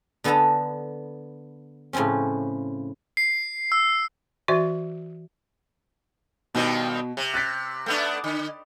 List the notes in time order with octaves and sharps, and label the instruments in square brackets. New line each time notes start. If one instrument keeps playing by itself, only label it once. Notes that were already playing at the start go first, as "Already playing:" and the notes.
[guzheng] D3 B3 A4 D#5 A5 A#5
A2 C#3 F3 C4 C#4
[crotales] C7
E6
[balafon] E3 F#4 D5 E5
[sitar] G2 D#3 C4 [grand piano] B2
[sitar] C3
[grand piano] F#6 A6 B6
[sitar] A3 B3 D4
D3